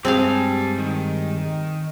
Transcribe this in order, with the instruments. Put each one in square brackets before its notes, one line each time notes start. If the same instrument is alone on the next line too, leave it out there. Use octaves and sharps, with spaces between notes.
[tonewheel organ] G2 G3 G#3 [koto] C4 G#4 F5 [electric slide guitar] G4 A5
[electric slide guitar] D#3